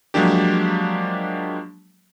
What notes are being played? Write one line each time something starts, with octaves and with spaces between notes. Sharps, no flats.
F3 F#3 G#3 A#3 D4 G4